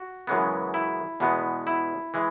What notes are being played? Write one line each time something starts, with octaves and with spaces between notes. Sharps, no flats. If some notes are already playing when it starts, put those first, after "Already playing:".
Already playing: F#4
F#2 C#3 E3 G#3 B3
E4
E2 B2 G#3 B3
E4
E3 G#3